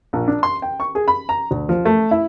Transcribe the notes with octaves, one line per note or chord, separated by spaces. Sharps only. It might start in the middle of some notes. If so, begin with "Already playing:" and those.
A#1
D4
C6
G5
C#6
G#4
B5
A#5
D2
F3
A3
E4